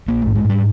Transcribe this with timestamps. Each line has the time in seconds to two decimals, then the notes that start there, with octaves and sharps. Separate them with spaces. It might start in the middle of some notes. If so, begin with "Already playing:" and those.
0.08 A#1 A#3
0.22 G#2 A3
0.36 G#3
0.45 G#2 G3